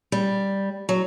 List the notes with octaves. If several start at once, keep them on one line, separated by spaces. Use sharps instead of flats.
G3
F#3